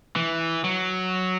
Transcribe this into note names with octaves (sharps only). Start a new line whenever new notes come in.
E3
F#3